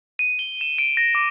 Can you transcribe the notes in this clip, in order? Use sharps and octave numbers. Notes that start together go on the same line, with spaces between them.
D#7
G7
E7
D7
A#6
D6